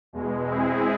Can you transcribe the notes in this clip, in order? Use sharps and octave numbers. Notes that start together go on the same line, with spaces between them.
E2 B2 G#3
G#3 C4 E4 G#4